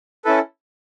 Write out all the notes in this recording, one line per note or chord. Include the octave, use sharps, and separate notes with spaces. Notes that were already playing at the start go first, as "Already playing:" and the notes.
C#4 E4 A4 B4